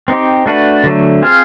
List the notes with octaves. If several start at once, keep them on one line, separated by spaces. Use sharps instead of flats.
C4 D#4 G4
A3 D4 F#4 B4
D3 F#3 A3
C4 F4 G#4 C5 F5